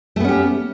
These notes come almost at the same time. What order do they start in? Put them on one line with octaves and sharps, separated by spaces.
A3 B3 C#4 G4